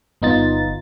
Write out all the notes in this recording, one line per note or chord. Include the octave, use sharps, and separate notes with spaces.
G1 B3 D#4 F4 A6